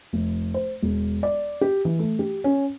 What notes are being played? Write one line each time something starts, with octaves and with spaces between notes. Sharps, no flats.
F1
C5
E1
D5
G4
E3
A3
G4
C#4